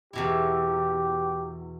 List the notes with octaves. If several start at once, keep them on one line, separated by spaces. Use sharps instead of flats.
E2 B2 E4 G4